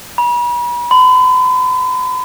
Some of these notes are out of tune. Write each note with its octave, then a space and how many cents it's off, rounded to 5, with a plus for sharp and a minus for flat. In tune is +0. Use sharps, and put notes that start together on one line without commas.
B5 -40
B5 +45